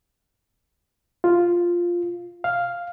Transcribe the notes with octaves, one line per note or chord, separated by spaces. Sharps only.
F4
F5